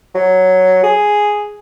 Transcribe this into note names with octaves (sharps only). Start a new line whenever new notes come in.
F#3
G#4